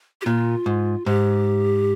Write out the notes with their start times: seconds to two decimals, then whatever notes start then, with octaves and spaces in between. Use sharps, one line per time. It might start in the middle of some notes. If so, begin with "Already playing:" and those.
0.21 G4
0.26 A#2 F4
0.66 G#2
1.06 G#2 G4